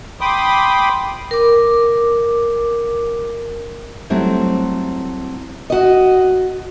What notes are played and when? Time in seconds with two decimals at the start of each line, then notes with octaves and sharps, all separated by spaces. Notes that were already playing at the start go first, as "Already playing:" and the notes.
0.21 G5 B5 C6 D6 D#6
1.31 A#4 D6
4.10 F#3 G3 A3 C4 E4
5.70 F#4 D#5